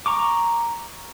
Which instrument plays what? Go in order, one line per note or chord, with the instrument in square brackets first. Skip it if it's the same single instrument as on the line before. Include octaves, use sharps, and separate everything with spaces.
[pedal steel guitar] A#5 C#6 D6